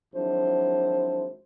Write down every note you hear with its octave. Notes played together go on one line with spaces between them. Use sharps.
G#1 F3 F#3 D4 E4 C5